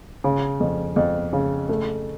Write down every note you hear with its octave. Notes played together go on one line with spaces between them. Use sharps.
C#3
F2
F2
C#3
A3